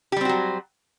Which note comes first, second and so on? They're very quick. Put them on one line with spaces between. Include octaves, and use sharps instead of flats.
G4 G3 C4 F#4 F#3